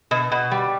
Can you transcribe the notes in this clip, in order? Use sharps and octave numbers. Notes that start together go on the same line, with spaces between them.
B2
B2
G3